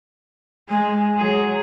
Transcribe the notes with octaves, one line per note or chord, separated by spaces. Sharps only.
G#3 G#5
F#3 G#4